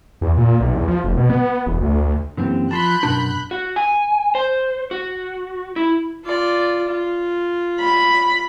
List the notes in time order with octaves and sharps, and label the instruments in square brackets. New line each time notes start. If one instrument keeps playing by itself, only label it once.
[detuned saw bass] E2
A#2
B1
E2
F3
F1
B2
B3
B3
E1
D2
D2
[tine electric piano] F#2 E3 A#3 [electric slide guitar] D3 C4 G4
[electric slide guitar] F3 [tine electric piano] A5 C6 B6 [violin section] B5 F#6 G6
[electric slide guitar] F#2 B2 A#4 [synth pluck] D4
[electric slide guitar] F#4
G#5
C5
F#4
E4
[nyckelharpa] F4 D5
F4
[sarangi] B5